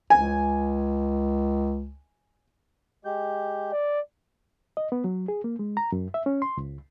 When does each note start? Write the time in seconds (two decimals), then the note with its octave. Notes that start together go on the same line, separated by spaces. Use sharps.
0.10 C#2 G#5
3.05 G#3 G4 G6
3.72 D5
4.77 D#5
4.92 B3
5.04 F#3
5.28 G#4
5.44 A#3
5.59 G#3
5.77 A#5
5.92 F#2
6.14 E5
6.26 C#4
6.42 C6
6.57 C#2